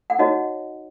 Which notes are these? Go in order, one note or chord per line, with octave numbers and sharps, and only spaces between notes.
F#5
D#4 F#4 C#5 D#5